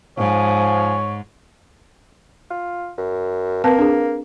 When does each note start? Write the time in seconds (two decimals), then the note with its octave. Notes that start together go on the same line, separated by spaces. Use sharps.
0.18 G#2 F3 C#5 G#5
2.51 F4
2.98 F#2
3.64 A#3 C4 B4 A5
3.79 D4 G#4